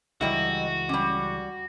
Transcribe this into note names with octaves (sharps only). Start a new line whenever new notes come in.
C#2 E3 F#3 G3 E4 F#4 D#5
G3 C#4 D6